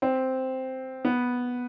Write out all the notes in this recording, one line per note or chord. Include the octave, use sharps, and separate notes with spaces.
C4
B3